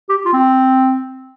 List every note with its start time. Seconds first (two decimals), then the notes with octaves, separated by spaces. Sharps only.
0.09 G4
0.26 F4
0.33 C4